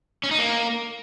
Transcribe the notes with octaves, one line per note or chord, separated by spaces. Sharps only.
C#4
D#4
A#3